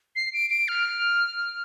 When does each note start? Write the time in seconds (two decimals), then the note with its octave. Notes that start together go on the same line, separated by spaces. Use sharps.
0.16 C7
0.33 D7
0.50 D7
0.68 F6